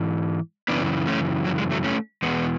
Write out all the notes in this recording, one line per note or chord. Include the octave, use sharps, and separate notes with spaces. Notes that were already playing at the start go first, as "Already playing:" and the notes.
Already playing: G#2 E3
F#2 C#3 E3 B3 D4
A3 C#4
F#3
G#3
F#3 A3
A3 C#4
E2 B2 G#3 B3